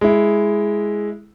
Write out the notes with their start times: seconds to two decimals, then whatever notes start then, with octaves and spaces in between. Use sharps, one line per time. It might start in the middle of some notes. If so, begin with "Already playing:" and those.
0.01 G#3 E4